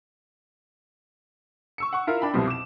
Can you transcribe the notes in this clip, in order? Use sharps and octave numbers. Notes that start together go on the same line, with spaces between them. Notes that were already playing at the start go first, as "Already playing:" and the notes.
C#6 E6 C#7
F#5 C#6
E4 F4 A#4 E5 F5
D4 G5 B5
C2 F2 B2 G3 C4
D6 E7